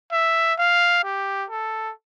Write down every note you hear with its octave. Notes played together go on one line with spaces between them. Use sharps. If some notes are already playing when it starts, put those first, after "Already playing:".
E5
F5
G4
A4